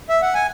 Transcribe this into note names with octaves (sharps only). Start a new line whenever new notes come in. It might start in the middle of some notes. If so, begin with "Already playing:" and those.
E5
F#5
G#5